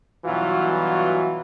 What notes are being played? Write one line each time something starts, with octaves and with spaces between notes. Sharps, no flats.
G2 B2 E3 F#3 F4 F#4